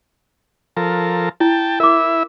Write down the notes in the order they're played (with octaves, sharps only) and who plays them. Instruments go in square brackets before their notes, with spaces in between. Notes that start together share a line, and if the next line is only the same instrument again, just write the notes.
[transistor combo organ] F3 A4 A#4
[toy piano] E4 [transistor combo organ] G5 A5
[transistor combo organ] E4 E5 [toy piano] A#4 D6